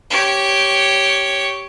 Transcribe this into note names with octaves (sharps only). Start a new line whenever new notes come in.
G4 C#5